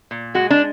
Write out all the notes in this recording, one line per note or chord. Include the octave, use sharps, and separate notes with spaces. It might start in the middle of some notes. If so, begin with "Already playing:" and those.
A#2
G#3 F#4
D4